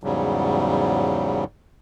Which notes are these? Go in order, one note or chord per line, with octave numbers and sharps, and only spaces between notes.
E2 G#2 C#3 F#3 G3